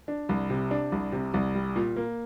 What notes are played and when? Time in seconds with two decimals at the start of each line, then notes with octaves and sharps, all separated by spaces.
0.08 D4
0.29 C2
0.50 C3
0.71 D4
0.92 C2
1.12 C3
1.34 C2
1.55 G3
1.76 A#2
1.96 A#3